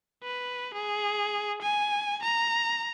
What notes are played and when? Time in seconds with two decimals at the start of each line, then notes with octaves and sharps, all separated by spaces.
0.23 B4
0.73 G#4
1.62 G#5
2.23 A#5